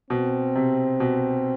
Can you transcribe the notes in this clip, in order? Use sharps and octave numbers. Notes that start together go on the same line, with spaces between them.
B2 C4
C3
B2